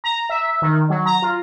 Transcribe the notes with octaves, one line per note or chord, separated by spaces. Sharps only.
A#5
E5
D#3
F#3
A#5
F4